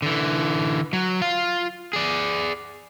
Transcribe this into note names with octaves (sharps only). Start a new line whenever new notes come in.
D3 E3
F#3
F4 F5
G#4 D5